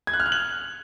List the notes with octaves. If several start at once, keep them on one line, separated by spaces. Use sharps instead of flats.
G#6
F#6
F6
F#6
F#7